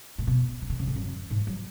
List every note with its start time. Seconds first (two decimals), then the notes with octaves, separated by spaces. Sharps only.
0.18 A2
0.27 B2
0.62 C#3
0.70 D3
0.79 C#3
0.87 A2
0.96 F#2
1.30 G#2
1.47 F#3